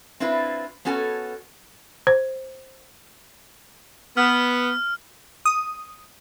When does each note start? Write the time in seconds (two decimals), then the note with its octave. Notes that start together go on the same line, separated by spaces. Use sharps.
0.20 C4 D4 E4 F4 B4
0.85 B3 C#4 F#4 A4 G#5
2.07 C5
4.17 B3 F6
5.46 D#6